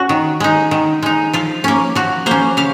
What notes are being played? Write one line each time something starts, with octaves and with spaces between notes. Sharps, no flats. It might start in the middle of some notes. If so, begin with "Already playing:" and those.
Already playing: C#4 F#4
D#3
G#3 D#4
D#3
G#3 D#4
F3 F4
A#3 C#4
F3 F#4
A#3 C#4 C5
C#3 F5